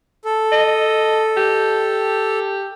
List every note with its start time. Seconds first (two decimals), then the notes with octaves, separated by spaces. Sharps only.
0.25 A4
0.52 D#5
1.37 G4